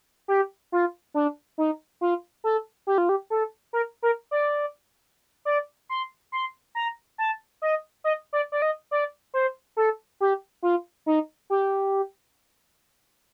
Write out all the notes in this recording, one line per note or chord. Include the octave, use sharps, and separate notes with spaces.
G4
F4
D4
D#4
F4
A4
G4
F4
G4
A4
A#4
A#4
D5
D5
C6
C6
A#5
A5
D#5
D#5
D5
D5
D#5
D5
C5
A4
G4
F4
D#4
G4